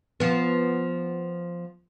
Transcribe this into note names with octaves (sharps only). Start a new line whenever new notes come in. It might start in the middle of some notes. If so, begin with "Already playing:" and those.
F3 B3